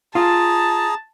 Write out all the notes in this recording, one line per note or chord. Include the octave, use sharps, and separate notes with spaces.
F4 G#4 A5 A#5